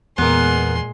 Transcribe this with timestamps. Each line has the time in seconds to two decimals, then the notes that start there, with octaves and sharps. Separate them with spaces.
0.18 E2 A#2 G#3 B3 A#4 C6